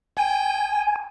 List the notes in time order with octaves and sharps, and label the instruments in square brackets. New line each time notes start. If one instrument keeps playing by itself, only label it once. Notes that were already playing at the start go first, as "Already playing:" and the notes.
[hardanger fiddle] G5 [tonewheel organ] G#5